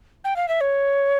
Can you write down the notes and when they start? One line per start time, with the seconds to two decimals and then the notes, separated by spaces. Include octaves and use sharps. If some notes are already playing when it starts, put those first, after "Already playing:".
0.24 G5
0.36 F5
0.48 E5
0.61 C#5